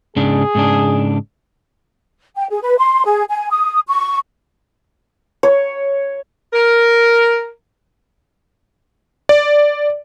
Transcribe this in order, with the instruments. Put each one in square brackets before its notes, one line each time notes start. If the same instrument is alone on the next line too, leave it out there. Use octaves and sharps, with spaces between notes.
[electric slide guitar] G#2 C#3 D4 [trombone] G#4
[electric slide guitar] G#2 C#3 D4
[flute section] G5
G#4
B4
C6
G#4
G#5
D#6
C#6
[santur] C#5
[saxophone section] A#4
[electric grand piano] D5